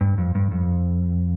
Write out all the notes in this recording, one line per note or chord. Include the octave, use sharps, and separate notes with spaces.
G2
F2
G2
F2